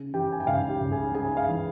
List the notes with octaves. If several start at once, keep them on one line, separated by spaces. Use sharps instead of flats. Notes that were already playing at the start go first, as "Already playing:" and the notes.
Already playing: C#3
E3 G4 G5
G#5
G5
C#2 F5
G4 G5
C#2
G#4 G#5
C#3 G#4 G#5
F5
E3